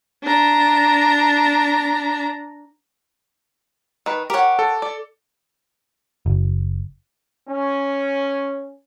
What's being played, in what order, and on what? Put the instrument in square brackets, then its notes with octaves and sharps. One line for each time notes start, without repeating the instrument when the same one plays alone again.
[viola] D4 A#5
[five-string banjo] D#3 B4
[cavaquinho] G4 F#5 [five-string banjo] A#4 C#5
[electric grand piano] A4
[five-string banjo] D5
[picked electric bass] F#1
[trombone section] C#4